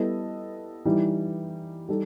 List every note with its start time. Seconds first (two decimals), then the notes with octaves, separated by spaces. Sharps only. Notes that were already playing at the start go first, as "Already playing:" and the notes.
Already playing: G3 B3 E4 A4 D#5
0.85 E3 G3 D#4
1.89 G3 D#4 A4